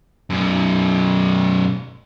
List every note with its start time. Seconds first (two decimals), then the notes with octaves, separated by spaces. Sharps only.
0.30 F#2 B2